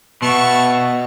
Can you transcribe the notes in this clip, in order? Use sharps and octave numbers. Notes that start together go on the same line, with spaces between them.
B2 B3 E5 F#5 A5 C#6